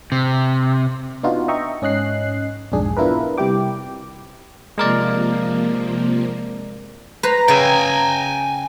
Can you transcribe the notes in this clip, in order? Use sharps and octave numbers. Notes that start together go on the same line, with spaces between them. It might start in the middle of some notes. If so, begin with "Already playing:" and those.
C3
B3 D4 D#4 F4 F#4
D#5 E5 G5 A#5 C#6
G#2 C#4 D#5 F#6 C7
B1 F2 G#2 D4 G#4
B3 D4 E4 F4 A#4 B4
C3 G3 E4 G4 G5 D6
C3 F3 G#3 A#3 A#4 D5
B4 C5 A#5
C#3 E5 G5 G#5